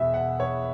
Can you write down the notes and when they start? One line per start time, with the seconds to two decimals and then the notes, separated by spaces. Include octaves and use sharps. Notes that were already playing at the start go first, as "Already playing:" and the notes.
Already playing: E1 E2 B2 E5
0.14 F#5
0.40 C#5